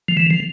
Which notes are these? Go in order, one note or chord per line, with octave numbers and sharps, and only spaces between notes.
F3
E3
F3